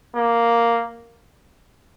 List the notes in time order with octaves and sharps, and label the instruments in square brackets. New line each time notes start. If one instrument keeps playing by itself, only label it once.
[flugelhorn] A#3